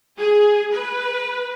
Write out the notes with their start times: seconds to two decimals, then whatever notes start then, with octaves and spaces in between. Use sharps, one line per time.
0.18 G#4
0.72 B4